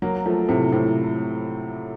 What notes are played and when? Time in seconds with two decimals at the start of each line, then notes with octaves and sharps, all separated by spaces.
0.02 F#3 A#3
0.26 F3 A3
0.49 A2 C3
0.72 A2 C3